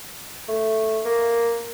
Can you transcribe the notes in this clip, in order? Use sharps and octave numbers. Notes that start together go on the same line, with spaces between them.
A3
A#3